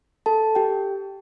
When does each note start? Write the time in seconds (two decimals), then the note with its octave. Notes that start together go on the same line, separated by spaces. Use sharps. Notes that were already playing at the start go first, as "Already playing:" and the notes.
0.26 A4 A5
0.55 G4 G5